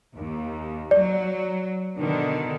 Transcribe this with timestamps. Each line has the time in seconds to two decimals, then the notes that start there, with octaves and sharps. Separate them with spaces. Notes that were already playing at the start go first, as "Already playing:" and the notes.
0.14 D#2
0.91 F#3 D5
1.98 B2 D3 D#3